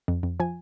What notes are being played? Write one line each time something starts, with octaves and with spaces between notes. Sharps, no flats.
F2
F2
F3 G#5